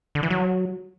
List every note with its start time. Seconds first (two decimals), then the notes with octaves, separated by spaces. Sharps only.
0.15 D3
0.23 E3
0.30 F#3